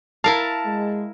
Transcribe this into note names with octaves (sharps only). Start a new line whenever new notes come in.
E4 A#4 F5 A5
G#3